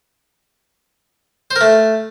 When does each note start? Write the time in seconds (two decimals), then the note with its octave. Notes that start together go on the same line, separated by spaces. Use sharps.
1.51 C5
1.56 A#4
1.61 A3